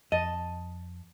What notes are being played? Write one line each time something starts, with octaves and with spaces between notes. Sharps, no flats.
F2 D#5 A5